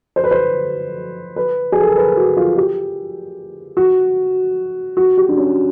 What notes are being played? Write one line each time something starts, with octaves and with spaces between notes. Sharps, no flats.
C5
B4
C5
B4
G#4
A4
A#4
B4
F#4
F4
G4
F#4
F#4
G4
D4
C#4